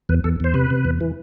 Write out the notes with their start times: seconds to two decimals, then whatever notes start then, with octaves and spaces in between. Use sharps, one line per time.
0.09 E2 B4
0.24 E2 A4
0.40 E2 C5
0.54 C3 B4
0.70 C3
0.85 E2
1.01 E3